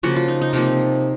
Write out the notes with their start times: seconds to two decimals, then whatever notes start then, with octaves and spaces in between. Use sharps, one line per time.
0.03 C#3 F3 A#3 F#4
0.16 F4
0.28 D#4
0.42 D#4
0.53 C3 F3 A#3 D#4